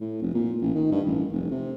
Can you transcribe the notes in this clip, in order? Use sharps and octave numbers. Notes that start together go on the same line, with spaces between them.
A2
F1
A#2
A1
D#3
G2
A1
F1
C3